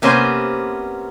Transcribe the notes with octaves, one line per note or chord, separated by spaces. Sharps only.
C3 A#3 B3 C#4 C5